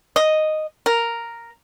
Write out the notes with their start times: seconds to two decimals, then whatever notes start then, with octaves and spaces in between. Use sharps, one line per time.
0.16 D#5
0.86 A#4